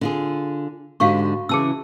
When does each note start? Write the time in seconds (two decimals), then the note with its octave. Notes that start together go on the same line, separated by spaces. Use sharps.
0.01 D3 F4 G#4
1.00 G#2 D3 F#4 G4 F5 C#6
1.49 C#3 E3 G#4 A5 E6